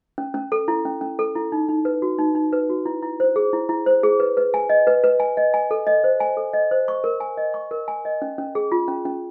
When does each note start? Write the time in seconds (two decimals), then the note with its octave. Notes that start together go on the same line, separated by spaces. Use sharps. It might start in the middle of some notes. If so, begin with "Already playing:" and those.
0.18 C#4
0.34 C#4
0.52 A4
0.68 E4
0.85 C#4
1.01 C#4
1.19 A4
1.35 E4
1.52 D#4
1.69 D#4
1.85 B4
2.02 F#4
2.19 D#4
2.35 D#4
2.53 B4
2.70 F#4
2.86 E4
3.03 E4
3.20 C5
3.36 G#4
3.53 E4
3.69 E4
3.86 C5
4.04 G#4
4.20 B4
4.37 B4
4.54 G#5
4.70 D#5
4.87 B4
5.04 B4
5.20 G#5
5.37 D#5
5.54 G#5
5.71 A4
5.87 D#5
6.04 C5
6.20 G#5
6.37 A4
6.53 D#5
6.71 C5
6.88 C#6
7.04 A#4
7.20 G#5
7.37 D#5
7.54 C#6
7.71 A#4
7.88 G#5
8.05 D#5
8.22 C#4
8.38 C#4
8.55 G#4
8.72 F4
8.88 C#4
9.05 C#4